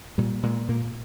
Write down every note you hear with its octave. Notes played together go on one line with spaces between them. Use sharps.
A#2 G3
A#2 G#3
A#2 A#3